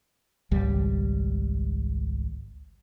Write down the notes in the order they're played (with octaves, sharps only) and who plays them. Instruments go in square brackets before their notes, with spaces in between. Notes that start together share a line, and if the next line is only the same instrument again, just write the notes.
[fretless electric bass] G#1 C#2 G3